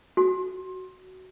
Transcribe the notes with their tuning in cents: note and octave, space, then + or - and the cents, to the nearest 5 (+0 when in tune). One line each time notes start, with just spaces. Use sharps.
F#4 +10